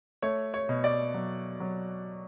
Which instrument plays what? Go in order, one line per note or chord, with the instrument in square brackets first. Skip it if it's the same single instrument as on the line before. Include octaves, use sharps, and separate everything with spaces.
[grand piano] A3 C#5
C#5
B2
D5
F#3
F#3